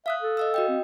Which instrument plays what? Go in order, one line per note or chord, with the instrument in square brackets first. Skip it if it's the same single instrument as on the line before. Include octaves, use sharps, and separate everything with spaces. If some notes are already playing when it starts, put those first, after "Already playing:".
[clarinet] E5 [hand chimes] F5 D#6 F#6
[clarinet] A4
[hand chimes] D#5 F5 E6
F#4 D#5 G5
[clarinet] C4